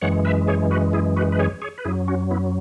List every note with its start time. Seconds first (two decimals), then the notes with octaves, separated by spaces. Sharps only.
0.01 F#2 E3 G#3 C#5 F#5
0.25 B4 E5
0.48 G#4 C#5
0.71 F#4 B4
0.93 E4 G#4
1.16 F#4 B4
1.32 B4
1.39 G#4 C#5
1.62 G#4 C#5
1.78 B4
1.85 F#2 F#3 E4 G#4
2.08 C#4 F#4
2.31 B3 E4